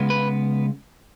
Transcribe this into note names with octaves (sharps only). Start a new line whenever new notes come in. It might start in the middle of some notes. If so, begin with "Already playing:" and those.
Already playing: C#3 G#3 B3
B4